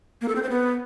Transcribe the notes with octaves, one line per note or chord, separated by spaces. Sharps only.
A#3
A4
C4
C5
B3